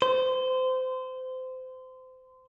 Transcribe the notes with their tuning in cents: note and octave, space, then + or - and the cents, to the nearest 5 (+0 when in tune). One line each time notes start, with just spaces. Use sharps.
C5 -25